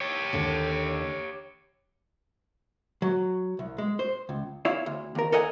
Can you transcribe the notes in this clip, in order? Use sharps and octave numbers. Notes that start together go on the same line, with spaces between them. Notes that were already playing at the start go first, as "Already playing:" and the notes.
G4 C#5
D#2 D3
F#3
C2
G#3
C5
C#2
E4 C#5 E5 F5
D2
D#2 A#4
A4 A#4 D#5 F#5 G#5